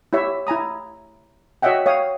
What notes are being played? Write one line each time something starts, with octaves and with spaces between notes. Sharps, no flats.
E4 G4 C#5 E5
E4 G#5 A#5 D#6
F#4 C#5 D#5 E5 F#5 G5
C#5 F5 G5 D#6